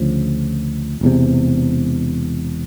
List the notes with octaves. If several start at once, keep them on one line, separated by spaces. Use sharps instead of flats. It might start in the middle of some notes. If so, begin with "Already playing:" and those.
Already playing: D2 C#3 F3
E1 E2 C3